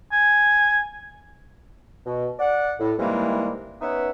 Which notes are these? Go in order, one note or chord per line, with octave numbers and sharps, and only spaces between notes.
G#5
B2
D5 F#5
A2
C3 D#3 E3 G3 G#3 A#3
B3 C#4 D#4 B4 E5 F#5